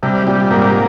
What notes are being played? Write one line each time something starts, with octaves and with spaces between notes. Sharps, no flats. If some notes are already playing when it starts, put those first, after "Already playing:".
C3 G3
A#2 G3
G#2 A#3